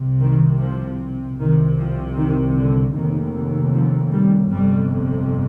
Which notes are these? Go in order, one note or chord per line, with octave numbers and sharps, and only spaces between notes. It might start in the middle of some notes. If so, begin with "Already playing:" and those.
Already playing: C2 C3
D#3
F3
C2 C3 D#3
F3
D#3
D3
F1 D#2 D#3
F3
G3
G1 F2 C3 G3